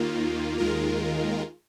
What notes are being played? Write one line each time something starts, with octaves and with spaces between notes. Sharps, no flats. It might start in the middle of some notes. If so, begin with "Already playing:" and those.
Already playing: D#2 D#3 A#3 F4
D#2 D#3 G#3 F4 A#4